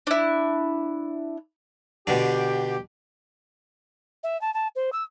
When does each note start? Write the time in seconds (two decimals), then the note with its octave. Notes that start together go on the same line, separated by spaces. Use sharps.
0.07 D4 E4
2.07 B2 D3 D4 G4
4.23 E5
4.41 A5
4.54 A5
4.76 C5
4.92 E6